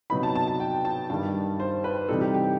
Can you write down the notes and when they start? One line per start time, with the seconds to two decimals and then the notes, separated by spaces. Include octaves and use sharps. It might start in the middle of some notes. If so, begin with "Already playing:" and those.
0.10 C3 F#3 B3 D#4 B5
0.23 A5
0.35 A5
0.47 A5
0.60 G5
0.85 A5
1.10 G2 D#3 G3 A5
1.60 C5
1.84 B4
2.09 C3 E3 G3 C4 D#4 A4
2.21 G4
2.34 G4